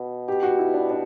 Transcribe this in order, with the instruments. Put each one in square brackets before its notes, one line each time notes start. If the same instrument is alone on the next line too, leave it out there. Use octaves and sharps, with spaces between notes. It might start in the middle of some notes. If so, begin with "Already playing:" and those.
Already playing: [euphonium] B2
[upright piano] G4
F#4
E4
D4
D4